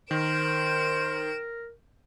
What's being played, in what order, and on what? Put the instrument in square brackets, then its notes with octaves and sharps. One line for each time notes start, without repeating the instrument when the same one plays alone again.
[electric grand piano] D#3 [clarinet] A#4 [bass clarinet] C5 [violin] D7 E7